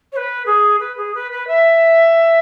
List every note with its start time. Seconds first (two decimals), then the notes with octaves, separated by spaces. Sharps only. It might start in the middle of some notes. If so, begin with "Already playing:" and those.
0.12 C#5
0.16 B4
0.46 G#4
0.80 B4
0.97 G#4
1.15 B4
1.32 B4
1.47 E5